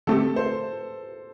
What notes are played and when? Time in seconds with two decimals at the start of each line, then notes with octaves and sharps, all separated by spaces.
0.07 D3 A3 C4 G4 A4
0.36 C5